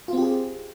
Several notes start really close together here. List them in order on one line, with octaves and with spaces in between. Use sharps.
F4 C4 G4 G#4